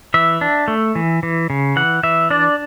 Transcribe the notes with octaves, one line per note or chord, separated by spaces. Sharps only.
E3 E5
D4
A3
E3
E3
C#3
E3 F#5
E3 E5
D4 D5